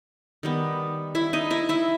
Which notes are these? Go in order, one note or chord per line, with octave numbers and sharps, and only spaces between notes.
D#3 G3 B3
E4 E5
D#4 D#5
E4 E5
E4 E5